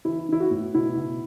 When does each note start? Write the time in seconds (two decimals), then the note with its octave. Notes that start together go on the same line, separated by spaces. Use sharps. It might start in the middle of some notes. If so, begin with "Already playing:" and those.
0.05 E3 E4
0.29 E3 E4
0.40 F#4
0.51 A2
0.74 B2 E4
0.97 B2